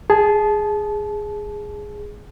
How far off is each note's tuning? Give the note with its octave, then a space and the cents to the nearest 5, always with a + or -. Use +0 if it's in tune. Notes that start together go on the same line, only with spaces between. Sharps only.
G#4 +0 A5 -25